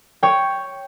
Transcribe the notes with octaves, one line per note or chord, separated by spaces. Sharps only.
C#5 G5